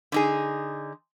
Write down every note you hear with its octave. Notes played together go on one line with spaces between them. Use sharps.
D3 D#4 G#4